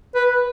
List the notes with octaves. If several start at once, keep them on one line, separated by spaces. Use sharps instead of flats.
B4